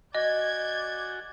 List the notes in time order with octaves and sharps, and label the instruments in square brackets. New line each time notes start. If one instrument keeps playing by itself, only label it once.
[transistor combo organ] F#4 G#5 [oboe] D5 [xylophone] D#5 [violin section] G6 G#6